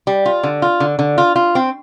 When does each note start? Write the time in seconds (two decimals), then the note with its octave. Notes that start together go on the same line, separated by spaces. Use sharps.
0.07 G3
0.26 F4
0.43 D3
0.62 F4
0.80 D3
0.99 D3
1.18 F4
1.36 F4
1.55 C4